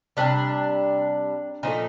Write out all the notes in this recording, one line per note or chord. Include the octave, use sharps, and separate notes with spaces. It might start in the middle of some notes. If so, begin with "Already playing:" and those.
C3 E3 G3 D4
A#2 F3 A3 D#4